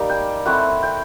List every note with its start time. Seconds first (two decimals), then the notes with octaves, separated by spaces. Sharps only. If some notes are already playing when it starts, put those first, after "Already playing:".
Already playing: G3 A#3 D#4 D5
0.10 G5
0.46 A3 C4 E4 F#5
0.83 G5